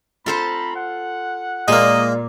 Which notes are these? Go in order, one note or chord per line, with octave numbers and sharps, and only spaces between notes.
C4 F4 A4 C5 A#5 B5
F#5
A#2 G#3 A#3 D#5